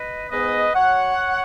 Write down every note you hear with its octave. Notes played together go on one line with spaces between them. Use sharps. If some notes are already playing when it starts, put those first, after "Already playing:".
Already playing: B4 D#5
G#2 G#3 B3 B4 D#5
F#3 C#5 F#5